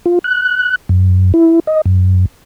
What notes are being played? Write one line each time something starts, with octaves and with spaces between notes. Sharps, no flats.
F4
F#6
F#2
E4
D#5
F#2